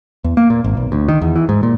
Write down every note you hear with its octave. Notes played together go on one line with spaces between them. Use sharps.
E2
A#3
A#2
G#1
B1
D2
D#3
E2
E3
G#2
A#2